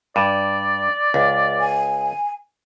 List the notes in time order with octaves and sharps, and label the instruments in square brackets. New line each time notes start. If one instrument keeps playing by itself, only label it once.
[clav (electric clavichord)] G2 [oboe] D5
[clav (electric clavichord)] C#2
[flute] G#5